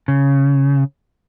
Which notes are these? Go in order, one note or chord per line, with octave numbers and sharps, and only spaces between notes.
C#3